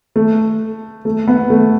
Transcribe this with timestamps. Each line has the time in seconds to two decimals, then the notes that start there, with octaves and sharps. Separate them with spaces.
0.16 A3
1.05 A3
1.28 B3
1.50 A3